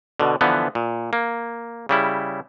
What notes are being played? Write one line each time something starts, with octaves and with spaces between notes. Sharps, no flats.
B2 D3
D3 E3 F3 B3
A#2
A#3
C#3 G3 E4